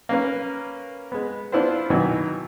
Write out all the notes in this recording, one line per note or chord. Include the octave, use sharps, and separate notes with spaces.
A#3 C#4 B4
G#3 B3
B3 D4 E4 F4 B4 C5
B2 D#3 E3 F#3 B3